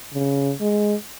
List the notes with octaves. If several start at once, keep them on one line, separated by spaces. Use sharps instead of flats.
C#3
G#3